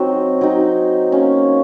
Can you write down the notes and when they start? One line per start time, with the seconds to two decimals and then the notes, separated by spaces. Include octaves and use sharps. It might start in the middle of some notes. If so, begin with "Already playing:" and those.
Already playing: F#3 C4 D#4 F#4 G#4
0.41 F#3 C4 D#4
1.12 F#3 A#3 C#4